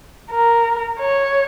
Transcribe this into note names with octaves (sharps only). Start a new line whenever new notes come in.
A#4
C#5